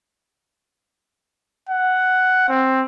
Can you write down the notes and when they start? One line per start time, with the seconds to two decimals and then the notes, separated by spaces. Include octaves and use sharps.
1.69 F#5
2.49 C4